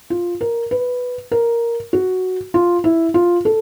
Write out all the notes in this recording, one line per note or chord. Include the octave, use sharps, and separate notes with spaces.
F4
A#4
B4
A#4
F#4
F4
E4
F4
A4